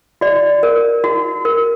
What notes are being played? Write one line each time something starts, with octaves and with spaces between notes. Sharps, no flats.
F#4 D5
A#4
F#4
A#4